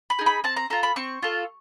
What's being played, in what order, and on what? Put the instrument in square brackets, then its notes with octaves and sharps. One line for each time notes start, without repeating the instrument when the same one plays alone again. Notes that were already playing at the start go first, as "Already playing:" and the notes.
[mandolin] B5
D#4 G#4
B5
C4 A5
A#5
F4 A4 A#5
B5
C4 C#6
F4 A4